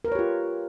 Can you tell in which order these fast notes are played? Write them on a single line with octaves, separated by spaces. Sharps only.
A#4 B4 C#5 G4 F4